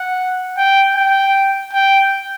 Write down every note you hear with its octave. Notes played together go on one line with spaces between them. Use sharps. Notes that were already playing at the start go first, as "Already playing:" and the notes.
Already playing: F#5
G5
G5
G5